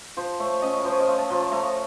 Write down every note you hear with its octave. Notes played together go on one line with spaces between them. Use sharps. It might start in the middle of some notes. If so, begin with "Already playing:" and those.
F3 C5
A3 C#5
C#4 D#5
A#4
F3 C5
C#5
D#5
A3 F5
A5
F3 A#5
A5
A3 A#5